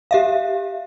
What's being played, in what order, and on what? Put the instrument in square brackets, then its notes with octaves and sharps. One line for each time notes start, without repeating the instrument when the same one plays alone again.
[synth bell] G4 E5 F5